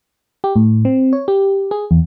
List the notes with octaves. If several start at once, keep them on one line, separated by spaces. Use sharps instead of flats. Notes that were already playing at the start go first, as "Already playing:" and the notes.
G4
A2
C4
C#5
G4
G#4
E2